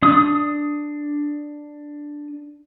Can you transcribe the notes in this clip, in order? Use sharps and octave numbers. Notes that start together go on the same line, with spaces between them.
D4 D#6